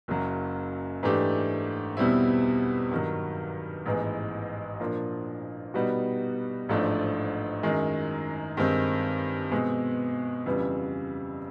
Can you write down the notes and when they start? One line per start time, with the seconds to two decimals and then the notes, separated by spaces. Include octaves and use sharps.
0.08 F#1 F#2 C#3 F#3
1.03 G#2 E3 A3 D4 G4
1.97 E2 B2 G3 C4 E4
2.91 G2 D#3 F#3
3.86 A1 G#2 E3 G#3 B3
4.79 A#2 F3 A#3 D4
5.74 B2 G3 B3 D#4 F#4
6.69 A1 G#2 F3 A3 D4
7.63 F#2 D#3 G#3
8.57 G2 D#3 G#3 C4
9.52 B2 G#3 C4
10.46 F2 C#3 E3 G3 B3